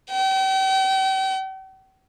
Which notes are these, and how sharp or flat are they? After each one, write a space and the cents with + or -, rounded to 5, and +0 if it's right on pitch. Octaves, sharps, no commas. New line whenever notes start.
G5 -40